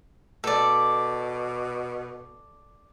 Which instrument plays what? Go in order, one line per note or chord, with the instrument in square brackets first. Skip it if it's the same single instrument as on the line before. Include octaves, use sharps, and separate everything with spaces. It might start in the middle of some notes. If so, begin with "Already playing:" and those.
[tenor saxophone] B2 [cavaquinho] A4 D5